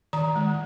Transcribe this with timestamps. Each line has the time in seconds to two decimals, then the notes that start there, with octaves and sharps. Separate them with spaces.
0.13 D#3 A#5
0.35 G#3